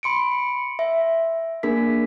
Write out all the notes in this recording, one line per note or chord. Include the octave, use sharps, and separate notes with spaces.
B5 C6 C#7 D7
E5
A#3 D4 G#4 A#4 B6